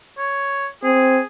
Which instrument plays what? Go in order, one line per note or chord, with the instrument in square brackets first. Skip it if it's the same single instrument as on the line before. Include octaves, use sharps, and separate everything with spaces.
[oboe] C#5
[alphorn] C4 [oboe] G#4